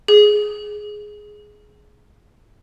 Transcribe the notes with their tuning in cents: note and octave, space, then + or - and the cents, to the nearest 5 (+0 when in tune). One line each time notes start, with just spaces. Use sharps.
G#4 +10